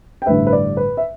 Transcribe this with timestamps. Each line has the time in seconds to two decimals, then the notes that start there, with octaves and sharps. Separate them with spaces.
0.22 G5
0.26 A1 G2 D3 B4 E5
0.47 B4
0.53 D5
0.77 B4
0.97 E5